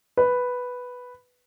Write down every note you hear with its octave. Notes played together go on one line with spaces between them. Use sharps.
B4